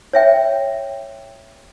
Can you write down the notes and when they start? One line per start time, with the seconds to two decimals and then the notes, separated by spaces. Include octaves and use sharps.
0.13 C#5 E5 G5